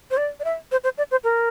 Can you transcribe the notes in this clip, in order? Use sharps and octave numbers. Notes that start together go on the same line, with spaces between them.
C5
D5
D5
E5
C5
C5
D5
C5
A#4